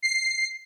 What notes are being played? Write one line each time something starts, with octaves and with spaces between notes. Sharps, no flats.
C7